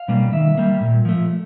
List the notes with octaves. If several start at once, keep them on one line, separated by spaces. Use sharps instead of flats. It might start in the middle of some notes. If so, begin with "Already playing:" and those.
Already playing: F5
B2 G3 A#3
D#3 E5
G3 A#3
A#2
F3 A3